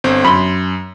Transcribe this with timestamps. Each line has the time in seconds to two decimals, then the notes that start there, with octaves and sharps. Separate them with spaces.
0.04 G1 C4
0.25 F#2 B5 C6